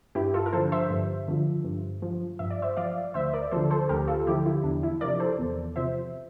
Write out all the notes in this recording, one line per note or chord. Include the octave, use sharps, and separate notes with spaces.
G2 E4 G4
F4 A4
A#4
D3 F3 A4 C5
C5 E5
G2
D3 F3
G2
F3
G2 E5
D5
C5 E5
F3 D5 F5
D2 C5 E5
A#4 D5
D3 F3 A4 C5
A4 C5
D2 G4 A#4
F4 A4
D3 F3 E4 G4
E4
E2 D4
E4
C3 F3 A#4 D5
A4 C5
E2
C3 F3 C5 E5